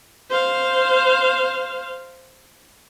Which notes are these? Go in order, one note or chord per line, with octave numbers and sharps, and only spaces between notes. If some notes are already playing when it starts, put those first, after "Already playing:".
C5 F5